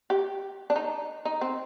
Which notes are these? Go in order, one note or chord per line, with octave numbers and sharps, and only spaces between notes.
G4
D4
D#4
D#4
C4